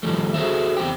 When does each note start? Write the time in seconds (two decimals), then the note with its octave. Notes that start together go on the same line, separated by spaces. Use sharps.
0.03 D#3 F3 G3 A3
0.34 F#4 G#4 A4 C5 E5
0.77 E2 A#3 C4 G4 G5